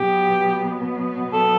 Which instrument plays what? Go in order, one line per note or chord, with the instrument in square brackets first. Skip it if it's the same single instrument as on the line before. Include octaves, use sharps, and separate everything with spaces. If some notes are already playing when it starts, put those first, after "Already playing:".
Already playing: [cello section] B2 F#3 B3 [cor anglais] G4
[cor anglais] A4